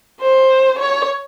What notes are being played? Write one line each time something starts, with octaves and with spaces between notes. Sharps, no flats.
C5
C#5